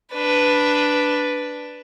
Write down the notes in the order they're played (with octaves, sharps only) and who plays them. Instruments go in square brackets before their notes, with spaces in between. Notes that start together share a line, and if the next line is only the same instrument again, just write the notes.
[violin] D4 B4